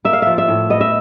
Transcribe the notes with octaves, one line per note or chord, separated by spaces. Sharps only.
A#3 E5
F5
F3 E5
E5
A2
B3 D#5
E5